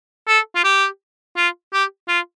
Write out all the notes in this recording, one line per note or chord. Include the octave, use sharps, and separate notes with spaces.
A4
F4
G4
F4
G4
F4